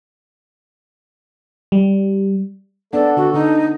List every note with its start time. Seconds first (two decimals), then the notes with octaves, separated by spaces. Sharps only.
1.72 G3
2.93 B3 D4 A4 D5
3.17 D3 F#4
3.34 D3 D#4